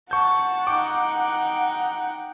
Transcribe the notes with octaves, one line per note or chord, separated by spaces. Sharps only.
F#5 A5 C#6 G6
D#4 G5 D6